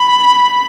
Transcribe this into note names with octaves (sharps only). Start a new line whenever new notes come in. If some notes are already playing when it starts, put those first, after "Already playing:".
Already playing: B5